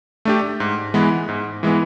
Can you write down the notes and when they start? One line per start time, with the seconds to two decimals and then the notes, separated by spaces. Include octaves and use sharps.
0.25 A3 D4 G4
0.60 G#2
0.94 E3 G#3 B3
1.29 G#2
1.63 E3 G#3 B3